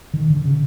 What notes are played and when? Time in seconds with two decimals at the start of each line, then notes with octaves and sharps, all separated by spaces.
0.14 D#3
0.30 D3
0.45 C#3